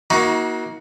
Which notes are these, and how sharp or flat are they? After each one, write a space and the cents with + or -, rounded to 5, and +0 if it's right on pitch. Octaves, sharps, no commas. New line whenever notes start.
A#3 +25 D#4 +45 F#4 +0